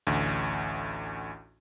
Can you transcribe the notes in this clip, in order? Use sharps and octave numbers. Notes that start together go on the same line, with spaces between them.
A1 D2